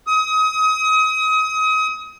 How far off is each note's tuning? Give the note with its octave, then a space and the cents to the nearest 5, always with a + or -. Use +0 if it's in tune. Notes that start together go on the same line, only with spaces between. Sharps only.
D#6 +30